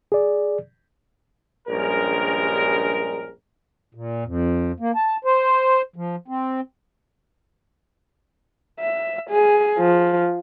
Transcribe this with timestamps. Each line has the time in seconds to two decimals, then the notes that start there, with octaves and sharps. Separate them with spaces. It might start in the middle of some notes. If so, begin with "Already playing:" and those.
0.12 G#4 D5
1.68 A#1 G2 G3 G#3 C#4 A#4
3.95 A#2
4.25 F2
4.80 A#3
4.96 A5
5.25 C5
5.96 F3
6.28 C4
8.80 E5
9.31 G#4
9.79 F3